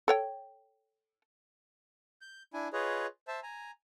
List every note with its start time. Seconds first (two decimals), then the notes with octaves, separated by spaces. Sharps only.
0.08 A4 C#5 G5
2.21 G6
2.53 D4 E4 G#5
2.73 F4 G#4 B4 C#5 D#5
3.28 C5 E5 A5
3.43 G#5 A#5